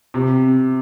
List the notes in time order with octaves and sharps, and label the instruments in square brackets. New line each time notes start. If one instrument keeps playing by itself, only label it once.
[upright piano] C3